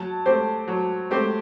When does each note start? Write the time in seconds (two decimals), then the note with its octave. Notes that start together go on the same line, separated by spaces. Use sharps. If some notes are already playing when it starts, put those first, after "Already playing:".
Already playing: F#3 A5
0.25 A3 C4 G4 C5
0.68 F#3
1.11 A3 C4 G4 C5